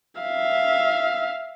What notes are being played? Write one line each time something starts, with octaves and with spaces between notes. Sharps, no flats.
E5 F5